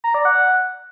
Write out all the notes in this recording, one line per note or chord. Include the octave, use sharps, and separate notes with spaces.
A#5
D5
F#5